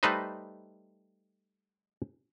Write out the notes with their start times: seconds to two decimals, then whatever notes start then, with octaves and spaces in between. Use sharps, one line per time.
0.03 G3 A3 D#4 B4 C5 D#5